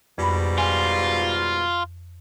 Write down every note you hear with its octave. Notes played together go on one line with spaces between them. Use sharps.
F2 G#2 B2 G3 B5
F4 G#5